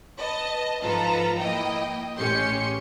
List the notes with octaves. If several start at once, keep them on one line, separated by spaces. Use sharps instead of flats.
B4 D#5 A5
G#2 F3 F4 A4 B4 A#5
A#3 E4 D#5 G5
A1 G#3 C#4 G4 C6 C#7